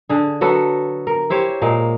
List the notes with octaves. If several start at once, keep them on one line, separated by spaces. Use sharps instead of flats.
D3 G#4
F#3 B3 F#4 A4
A#4
E4 G4 C5 C#5
A#2 G#3 A#3